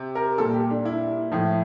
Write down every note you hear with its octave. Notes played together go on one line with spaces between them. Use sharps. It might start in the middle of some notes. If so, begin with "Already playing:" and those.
Already playing: C3
A#4
A#2 G3 A4
G4
D4
E4
A2 F3